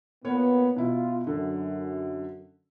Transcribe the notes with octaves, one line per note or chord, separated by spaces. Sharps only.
A#2 A#3 B3 C#5
B2 E4 F4
F#2 D3